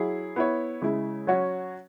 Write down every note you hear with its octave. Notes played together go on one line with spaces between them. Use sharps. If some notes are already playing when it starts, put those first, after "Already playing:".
Already playing: F#3 E4 G#4
B3 E4 C#5
C#3 G#3 E4
F#3 C#4 F#4 C#5